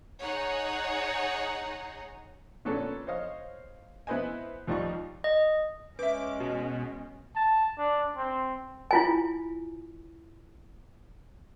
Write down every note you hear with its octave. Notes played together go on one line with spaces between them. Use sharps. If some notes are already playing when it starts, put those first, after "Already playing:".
D#4 G#4 C#5 F#5 A#5
A#2 D3 B3 C#4 D4 A4
C5 C#5 D#5 F5
B3 E4 B4 C5 D#5 G#5
D#2 F3 G3 D#4 F4 C#6
D#5
G#3 C#4 B4 E5 D6
B2
A5
D4
C4
E4 F4 G#5